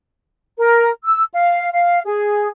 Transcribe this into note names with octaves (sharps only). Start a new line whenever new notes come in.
A#4
E6
F5
F5
G#4